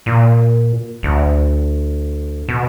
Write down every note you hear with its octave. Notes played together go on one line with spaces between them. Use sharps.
A#2
D2
B2